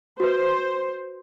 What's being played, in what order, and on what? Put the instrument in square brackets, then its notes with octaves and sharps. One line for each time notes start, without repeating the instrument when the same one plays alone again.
[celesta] F#4 B4 [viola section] C5